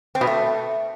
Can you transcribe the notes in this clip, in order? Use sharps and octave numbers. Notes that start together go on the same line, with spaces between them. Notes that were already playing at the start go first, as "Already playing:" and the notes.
C4
B2
A3